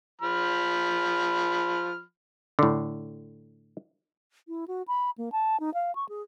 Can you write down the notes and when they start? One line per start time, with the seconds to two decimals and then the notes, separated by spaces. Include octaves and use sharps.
0.21 F3 B5 F6
2.59 A2 D3
4.48 E4
4.68 F#4
4.88 B5
5.18 A#3
5.32 A5
5.60 D#4
5.74 F5
5.95 C#6
6.09 G#4